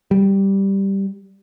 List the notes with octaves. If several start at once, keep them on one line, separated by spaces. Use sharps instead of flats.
G3